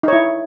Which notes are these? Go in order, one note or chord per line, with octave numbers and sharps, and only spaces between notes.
D#4 E4 C#5